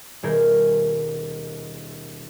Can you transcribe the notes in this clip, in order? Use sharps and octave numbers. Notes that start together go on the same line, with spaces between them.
D#1 B2 G#4 A#4 G6